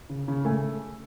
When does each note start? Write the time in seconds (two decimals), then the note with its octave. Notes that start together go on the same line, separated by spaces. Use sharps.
0.09 C#3
0.28 C#3
0.45 A3 G#5